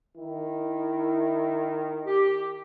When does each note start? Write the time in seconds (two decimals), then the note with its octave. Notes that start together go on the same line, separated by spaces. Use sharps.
0.17 D#3 E4
2.06 G4